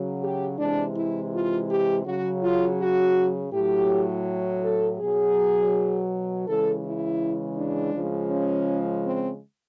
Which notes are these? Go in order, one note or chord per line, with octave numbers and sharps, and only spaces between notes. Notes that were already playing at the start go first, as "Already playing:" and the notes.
Already playing: C#3 F#3
G4
C3 E3 G#3 D4
E4
F4
G4
C#3 F#3 F#4
F4
F#4
A2 F#3 G4
A4
B2 F#3 G#4
C#3 E3 G#3 A4
E4
D4
C#3 F3 G#3
C#4
C4